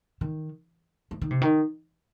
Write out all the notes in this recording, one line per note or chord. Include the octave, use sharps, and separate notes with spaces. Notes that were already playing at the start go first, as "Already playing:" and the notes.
D#3
E3
D#3
C3
D#3